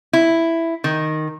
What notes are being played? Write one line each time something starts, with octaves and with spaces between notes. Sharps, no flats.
E4
D#3